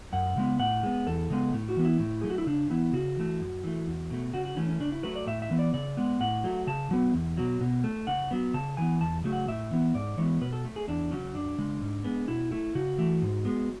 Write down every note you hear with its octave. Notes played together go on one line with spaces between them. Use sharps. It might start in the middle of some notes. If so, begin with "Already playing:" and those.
F#2 F#5
C#3 G#3 B3
A2 F#5
G#3 B3
E2 A4
C#3 G#3 B3
A2
F#4
E3 B3
E4
A2
F#3 A3 G#4
F#4
E4
C#3 D4
E3 B3 E4
C#3 F#4
E3 A3
F#2
E3 A3
E2
B2 A3
C#3 F#4
F#4
E3 A3 C#4
C#4
C#3 D4
E4
F#3 A3 B4
D5
A2 E5
E5
E3 B3
D5
C#3 D5
G#3 B3
A2 F#5
F#3 A3
C#3 A5
F#3 B3
E2
B2 F#3
B2
A3
C#3 F#5
F#3 B3
C#3 A5
E3 B3 G#5
E2 A5
C#3 F#3 A3
F#5
A2 E5
E3 B3
G#2 D5
E3 G#3 B3 C#5
B2 B4
A4
A3
G#4
E2 D4
C#3 F#3 C#4
F#2 D4
C#3 G#3
G#2
G#3 B3
B2 E4
A3 E4
C#3 F#4
E3 A3
G#2
G#3 B3